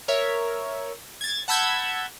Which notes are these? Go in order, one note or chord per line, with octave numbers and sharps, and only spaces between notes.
A#4 C#5 E5
G#6 A6
F#5 A5 B5 E6 G6 G#6